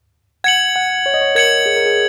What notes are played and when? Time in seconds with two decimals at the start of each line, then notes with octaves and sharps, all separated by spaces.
0.44 F#5 G#6 C#7 F#7
0.76 F#5
1.06 C#5
1.14 D#5
1.21 C#5
1.35 A#4 G#6 C#7 F#7
1.66 G#4
1.76 A#4
1.86 G#4